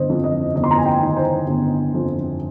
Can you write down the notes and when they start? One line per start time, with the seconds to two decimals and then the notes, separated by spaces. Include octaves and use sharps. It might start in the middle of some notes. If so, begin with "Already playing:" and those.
Already playing: G1 C5 D#5
0.09 F2
0.24 D#5
0.55 G1 D#5
0.64 C6
0.71 A#5
0.78 G#5
0.85 G5
1.01 D#3
1.17 C5
1.47 G1
1.94 F2